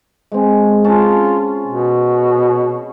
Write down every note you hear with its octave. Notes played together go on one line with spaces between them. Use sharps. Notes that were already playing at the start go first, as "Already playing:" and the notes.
G#3 C4
C#4 F4 A5
B2